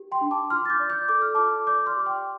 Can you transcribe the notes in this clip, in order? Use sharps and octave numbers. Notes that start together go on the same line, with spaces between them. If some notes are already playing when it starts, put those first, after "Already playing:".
Already playing: G4
G5 C6
D4
A5 D6
F4 C6 F6
A6
D6 G6
D5
D6 G6
A4 D6
F6
F4 A5 D6
D5 D6 G6
C6 F6
G4 D6
G5 C6